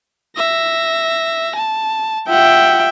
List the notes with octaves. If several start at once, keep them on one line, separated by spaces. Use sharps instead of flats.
E5 A#6
A5
F4 E5 F#5 G5